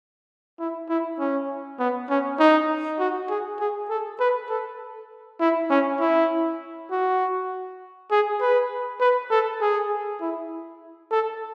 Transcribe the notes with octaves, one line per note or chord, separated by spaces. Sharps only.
E4
E4
C#4
B3
C#4
D#4
F#4
G#4
G#4
A4
B4
A4
E4
C#4
E4
F#4
G#4
B4
B4
A4
G#4
E4
A4